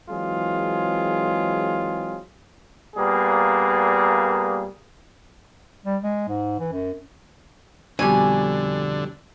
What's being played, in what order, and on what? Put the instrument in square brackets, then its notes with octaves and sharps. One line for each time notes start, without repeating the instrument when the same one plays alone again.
[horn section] E3 F#3 G#3 C4 F4 G#4
[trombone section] A#2 G3 A#3 B3 G#4
[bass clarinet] G3
G#3
G#2
E3
F#2
[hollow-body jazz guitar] F2 B2 G3 [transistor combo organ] D3 [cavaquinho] G#5